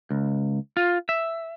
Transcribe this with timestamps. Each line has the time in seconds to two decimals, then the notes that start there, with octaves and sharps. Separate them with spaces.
0.11 C#2
0.77 F4
1.09 E5